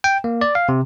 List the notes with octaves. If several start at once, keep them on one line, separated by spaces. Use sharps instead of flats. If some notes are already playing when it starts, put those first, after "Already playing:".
G5
A#3
D5
F5
C3